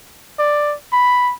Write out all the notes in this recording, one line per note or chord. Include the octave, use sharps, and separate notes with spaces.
D5
B5